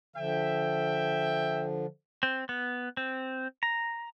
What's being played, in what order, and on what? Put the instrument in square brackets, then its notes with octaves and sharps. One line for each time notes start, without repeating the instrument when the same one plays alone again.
[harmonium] D3 F3 [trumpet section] E5 G5
[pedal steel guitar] C4
B3
C4
A#5